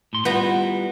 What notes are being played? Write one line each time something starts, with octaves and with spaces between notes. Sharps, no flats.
A2 C6
G3 B3 E4 F4 A#5